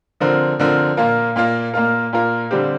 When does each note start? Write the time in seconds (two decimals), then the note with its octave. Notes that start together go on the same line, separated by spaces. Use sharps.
0.20 D3 F3 C4 A#4
0.59 D3 F3 C4 A#4
0.97 A#2 A#3 F4 A#4
1.36 A#2 A#3 F4 A#4
1.74 A#2 A#3 F4 A#4
2.13 A#2 A#3 F4 A#4
2.51 D3 G3 C4 G4